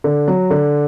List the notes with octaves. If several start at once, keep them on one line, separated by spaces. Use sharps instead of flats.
D3
F#3
D3